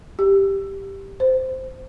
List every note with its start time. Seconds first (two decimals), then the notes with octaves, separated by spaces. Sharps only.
0.19 G4
1.20 C5